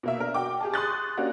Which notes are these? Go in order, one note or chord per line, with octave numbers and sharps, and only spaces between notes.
B2 A#3 E5
D4 A#4
F#4 G5 D6
G4 G#4 A5
C6 C#6 D#6 F#6 G6 A6
A#3 C#4 D4 F#4 G4